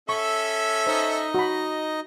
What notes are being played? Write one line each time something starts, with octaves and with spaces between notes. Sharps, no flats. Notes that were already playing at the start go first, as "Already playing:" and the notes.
C#4 A4 E5 C#6
D#4 C5 D#5
F#4 B5